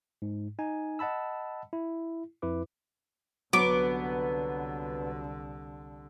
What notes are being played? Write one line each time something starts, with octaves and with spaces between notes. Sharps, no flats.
G#2
D#4 G#5
D#5 F#5 A5 B5 E6
E4
F2 E4 B4 D6
C2 D3 F#3 B3 D6